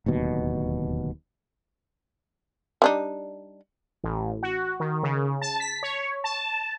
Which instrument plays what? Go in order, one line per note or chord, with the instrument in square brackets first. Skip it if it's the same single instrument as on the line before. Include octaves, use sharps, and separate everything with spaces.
[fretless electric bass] D1 D#2 B2
[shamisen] G3 D4 D#4
[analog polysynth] A1
F#4
D#3
C#3
A5
B6
C#5
A5